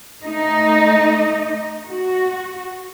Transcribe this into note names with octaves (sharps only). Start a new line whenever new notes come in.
A3 D#4 D#5
F#4